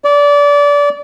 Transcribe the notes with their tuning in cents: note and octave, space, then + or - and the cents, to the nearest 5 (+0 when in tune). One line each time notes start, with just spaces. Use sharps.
D5 -25